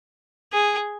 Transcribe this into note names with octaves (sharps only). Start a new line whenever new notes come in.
G#4